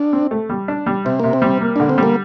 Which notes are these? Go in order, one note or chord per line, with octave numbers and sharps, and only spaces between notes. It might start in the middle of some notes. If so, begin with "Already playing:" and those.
Already playing: D4
C4
A3
G3
D4
G3
C3 C4
C3 A#3
C4
G3
A#3
D3 D4
C4
G3 A#3